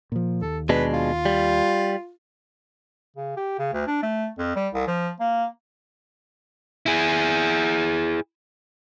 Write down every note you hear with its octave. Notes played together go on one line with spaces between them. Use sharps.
A#2 F3
D#2 A4
B2 G#3 D4 B4
F4
G3
C#3
G4
C#3
D2
D4
A3
F2
G3
C2
F3
A#3
E4 G#4